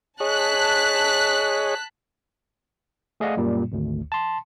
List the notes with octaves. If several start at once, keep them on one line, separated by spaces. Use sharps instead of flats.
G#4 C#5 D#5 A5 F#6 B6
A3 G#4 D5 D#5 F5 F#5
F#2 A#2 G3 A#3
G#1 D2
A5 C6